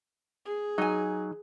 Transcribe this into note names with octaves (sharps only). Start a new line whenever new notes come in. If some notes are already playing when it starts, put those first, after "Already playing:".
G#4
F#3 D#4 G#5